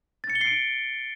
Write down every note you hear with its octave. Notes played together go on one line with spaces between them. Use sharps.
A6
C#7
G7
C7
D7